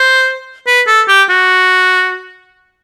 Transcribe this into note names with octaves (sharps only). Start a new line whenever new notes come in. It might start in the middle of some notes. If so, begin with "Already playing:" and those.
Already playing: C5
B4
A4
G4
F#4